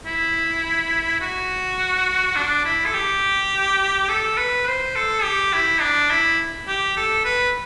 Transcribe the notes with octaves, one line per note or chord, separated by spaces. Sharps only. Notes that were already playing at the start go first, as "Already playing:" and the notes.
E4
F#4
D4
E4
A4
G4
A4
B4
C5
A4
G4
E4
D4
E4
G4
A4
B4